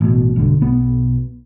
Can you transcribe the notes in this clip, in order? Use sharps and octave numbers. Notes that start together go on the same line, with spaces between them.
A1 B2
B1 G2 D3
B1 B3